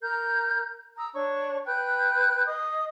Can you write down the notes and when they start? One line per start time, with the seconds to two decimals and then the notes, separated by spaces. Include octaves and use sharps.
0.03 A#4 A#5 F6 G6
0.98 A#5 D#6 E6
1.14 D4 C#5 C#6
1.67 B4 G5 F#6 G6
2.47 D#5 D#6